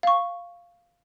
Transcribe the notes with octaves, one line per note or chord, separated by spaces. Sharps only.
F5 C#6